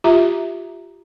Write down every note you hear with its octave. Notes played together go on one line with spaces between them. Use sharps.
F4 G4 E5 A#5